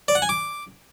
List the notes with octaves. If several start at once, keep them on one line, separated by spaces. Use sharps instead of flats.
D5
F#5
G#5
D6